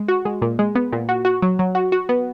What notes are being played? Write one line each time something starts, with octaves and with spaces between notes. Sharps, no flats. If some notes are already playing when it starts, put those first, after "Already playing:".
Already playing: G#3
F#4
G#3
A#2
G#3
B3
A#2
F#4
F#4
F#3
F#3
F#4
F#4
B3